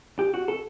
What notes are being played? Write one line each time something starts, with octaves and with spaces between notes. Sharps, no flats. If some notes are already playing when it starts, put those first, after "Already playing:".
G4
F#4
A4